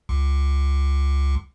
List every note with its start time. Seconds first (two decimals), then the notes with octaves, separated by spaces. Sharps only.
0.09 C#2